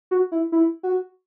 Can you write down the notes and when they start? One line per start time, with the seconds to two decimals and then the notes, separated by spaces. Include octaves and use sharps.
0.11 F#4
0.32 E4
0.52 E4
0.83 F#4